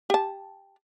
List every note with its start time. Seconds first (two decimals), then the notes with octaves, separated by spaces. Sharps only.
0.10 G4 A5